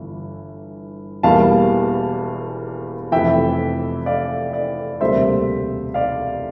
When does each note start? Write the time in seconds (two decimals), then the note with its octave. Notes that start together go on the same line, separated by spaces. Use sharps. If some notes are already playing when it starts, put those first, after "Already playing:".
Already playing: G1 G2 E3
1.23 E1 E2 E3 G3 A#3 F5 A5
3.12 F1 F2 E3 E5 G5
4.06 D5 F5
4.53 D5
5.01 E1 D2 C3 G3 A#3 C5 E5
5.94 D5 F5